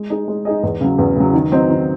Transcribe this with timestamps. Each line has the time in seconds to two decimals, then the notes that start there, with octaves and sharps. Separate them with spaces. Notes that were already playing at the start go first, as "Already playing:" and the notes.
Already playing: G#3
0.10 D#4 G#4 D#5
0.28 G#3
0.45 D#4 G#4 D#5
0.63 E2
0.81 C#3 F#3
0.98 E2
1.16 C#3 F#3
1.34 D#3
1.52 F#3 C4 D#4
1.69 D#3